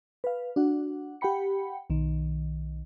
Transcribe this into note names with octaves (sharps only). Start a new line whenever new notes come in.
B4 F5
D4 F#4 F#5
G4 F#5 G5 B5 C#7
B1 D#3